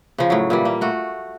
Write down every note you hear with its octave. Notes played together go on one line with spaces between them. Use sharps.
C#3 F3
A2 F#3
A#2 E3 G3
A#3
A3 F#4